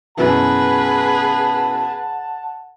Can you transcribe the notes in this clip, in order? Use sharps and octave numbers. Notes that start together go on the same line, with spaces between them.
F#2 B2 E3 G#4 B4 F#5 A5